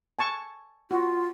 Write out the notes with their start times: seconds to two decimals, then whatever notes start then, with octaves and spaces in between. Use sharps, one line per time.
0.19 G#5 A5 C#6
0.91 F4 F#4